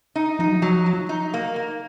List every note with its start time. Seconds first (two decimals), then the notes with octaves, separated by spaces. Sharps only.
0.15 D#4
0.39 F3 D#4
0.48 F#3
0.56 F3
0.62 F#3
0.86 F#3
1.09 D#4
1.34 A#3
1.56 A#3